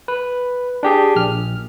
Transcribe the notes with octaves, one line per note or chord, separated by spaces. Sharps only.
B4
D4 G4 G#4
A#1 F6